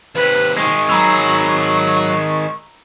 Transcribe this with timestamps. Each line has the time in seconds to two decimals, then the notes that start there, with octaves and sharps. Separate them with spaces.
0.15 D#2 C3 B4
0.58 D#3 G#3 C#6
0.89 F#3 A#5 B5 E6